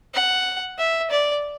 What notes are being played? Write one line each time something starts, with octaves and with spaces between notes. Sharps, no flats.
F#5
E5
D5